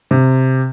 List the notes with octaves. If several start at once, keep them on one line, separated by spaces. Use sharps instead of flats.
C3